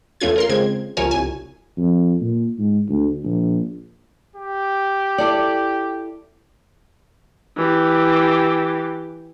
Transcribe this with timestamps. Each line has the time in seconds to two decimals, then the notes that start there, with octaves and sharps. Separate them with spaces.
0.20 E2 A3 C#4 F4 G#6
0.36 F4 A#4 C6
0.49 C#3 G#3 C4 G#6
0.97 G1 C#2 F3 A#4 C#5 G#5
1.11 C2 G#5
1.78 F2
2.20 A#2
2.58 G#2
2.89 D2
3.24 A#1
4.36 G4
5.18 E4 A4 D5
7.57 E3 G4